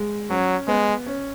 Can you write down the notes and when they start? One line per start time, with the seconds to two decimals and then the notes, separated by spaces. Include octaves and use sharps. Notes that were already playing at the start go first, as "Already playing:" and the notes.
Already playing: G#3
0.30 F#3 C#4
0.68 G#3 B3
1.06 C#4